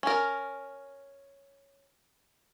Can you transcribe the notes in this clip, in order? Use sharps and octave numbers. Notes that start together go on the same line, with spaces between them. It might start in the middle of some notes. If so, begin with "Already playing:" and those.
C#4 A#4